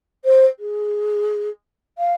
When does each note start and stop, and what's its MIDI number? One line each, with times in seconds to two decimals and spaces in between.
0.24 0.45 72
0.59 1.49 68
1.98 2.14 77